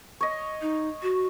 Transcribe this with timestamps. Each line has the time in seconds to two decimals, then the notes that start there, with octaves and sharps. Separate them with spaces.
0.21 C#5 D#5
0.61 D#4
1.02 F#4